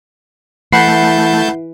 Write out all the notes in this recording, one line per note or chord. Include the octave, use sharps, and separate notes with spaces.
E3 A3 F#5 A5 B5 G6 C7